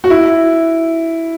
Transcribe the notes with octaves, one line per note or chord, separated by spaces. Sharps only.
F#4
E4